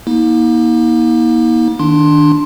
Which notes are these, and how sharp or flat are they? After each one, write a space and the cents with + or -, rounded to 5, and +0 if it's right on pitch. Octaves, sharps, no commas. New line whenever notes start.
A#3 +40 D#4 +45
D#3 +5 D4 +0 C6 +10